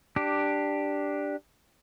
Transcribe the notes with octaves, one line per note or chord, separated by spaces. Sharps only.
D4 G4